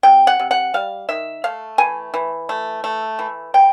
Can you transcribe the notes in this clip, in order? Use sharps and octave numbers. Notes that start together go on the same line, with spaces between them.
C3 G5
F#5
C3
F#5
G3 F5
D#3 E5
A3 F5
E3 G#5
E3
A3
A3
E3
E3 G5